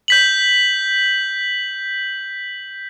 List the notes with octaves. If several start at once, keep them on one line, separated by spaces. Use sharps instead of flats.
G6 B6 F#7